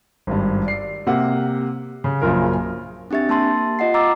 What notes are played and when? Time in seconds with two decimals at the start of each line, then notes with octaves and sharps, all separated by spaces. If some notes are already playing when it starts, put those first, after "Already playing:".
0.27 G#1 G2
0.65 D5 C7
1.07 C3 A#3 F#5
2.04 C#3
2.22 A#1 F#2 C#3 F4 A#4
3.11 C4 D4 G4 E5 A6
3.29 A#3 A5 C6 A6
3.79 F4 D#5 F#5 C7
3.94 A#5 D6 E6 A6